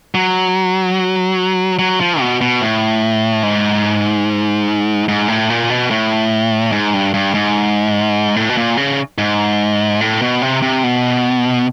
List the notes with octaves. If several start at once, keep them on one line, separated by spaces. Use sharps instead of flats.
F#3
F#3
F3
B2
B2
A2
G#2
G#2
A2
A#2
B2
A2
G#2
G2
G2
G#2
A2
B2
A#2
C#3
G#2
A2
B2
C3
C3
B2